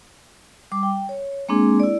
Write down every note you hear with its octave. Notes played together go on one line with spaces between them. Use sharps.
G3 D6
G5
C#5
G#3 A#3 C4 D4 G#4
E4 D5